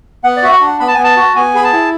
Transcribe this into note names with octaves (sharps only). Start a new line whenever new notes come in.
B3 F#5
D5
F#4 E5
F#5
D4
B3 B5
A5
G#5
B3
A5
F#4
B3 G#5
G#4 B5
A5
E4